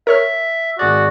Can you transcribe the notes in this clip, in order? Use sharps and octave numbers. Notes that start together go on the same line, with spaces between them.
A#4 C#5 E5 F6
G#1 F#4 G#4 D5